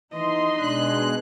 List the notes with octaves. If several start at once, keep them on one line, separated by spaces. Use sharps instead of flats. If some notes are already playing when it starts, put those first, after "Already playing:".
E3 D#4 D#5 C6
B2 G#3 D4 F#6